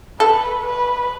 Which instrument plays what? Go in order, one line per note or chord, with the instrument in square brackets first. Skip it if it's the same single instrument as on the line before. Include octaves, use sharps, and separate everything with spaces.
[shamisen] A4 [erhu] B4
[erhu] B4